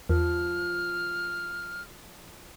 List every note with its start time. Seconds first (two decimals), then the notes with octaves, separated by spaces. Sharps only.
0.09 E2 F3 F6